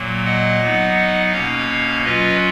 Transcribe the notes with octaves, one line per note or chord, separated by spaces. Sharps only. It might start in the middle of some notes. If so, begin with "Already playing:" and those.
Already playing: A#2 F#3 A#3
D#5 F#5
F#3 B3 D#4
B2 A#3 C#4 C#5 F5
F#3 C#4 F4 B4 D#5